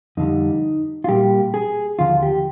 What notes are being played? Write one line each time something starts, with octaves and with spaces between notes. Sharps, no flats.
F2 D3 G3 D#4
F4
A#2 G3 A#3 G4
G#4
D#2 D3 F3 F4
G4